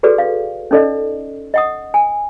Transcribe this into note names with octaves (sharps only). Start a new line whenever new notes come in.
F#4 G#4 A4 B4 D5
F5
C#4 D#4 A4 D5 D#5
D#5 F#5 D#6
G#5